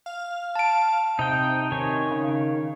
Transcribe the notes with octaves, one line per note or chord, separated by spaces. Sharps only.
F5
A5 D7
C3 D#4 G5
D#3 C#5 G#5
C#3